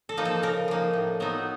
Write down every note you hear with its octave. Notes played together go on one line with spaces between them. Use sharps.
A4
F3 A#3 D#4
A4
C#3 A#4
F3 A#3 D#4
A2
F#3 B3 D#4